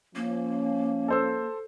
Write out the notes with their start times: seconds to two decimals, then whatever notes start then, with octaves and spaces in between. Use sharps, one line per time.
0.16 F3 A#3 C#4
1.08 A4 C5 E6